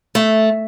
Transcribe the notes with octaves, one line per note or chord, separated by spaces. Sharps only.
A3